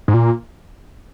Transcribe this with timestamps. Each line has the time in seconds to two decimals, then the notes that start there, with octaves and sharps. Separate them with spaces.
0.08 G#2
0.14 A#2